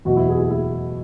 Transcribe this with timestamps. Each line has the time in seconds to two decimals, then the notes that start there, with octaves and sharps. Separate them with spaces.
0.05 E2 B2 F#3 F#4
0.17 E4
0.29 E4 G#4
0.39 E4 G#4
0.50 E4 G#4